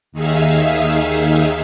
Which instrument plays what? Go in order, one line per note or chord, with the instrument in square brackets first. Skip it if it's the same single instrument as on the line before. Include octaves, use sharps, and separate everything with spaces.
[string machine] D#2 D#3 D#4 G#4 E5 F5